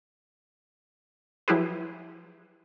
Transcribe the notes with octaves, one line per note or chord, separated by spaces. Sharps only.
F3 F#3 E4 G4 G#4 B4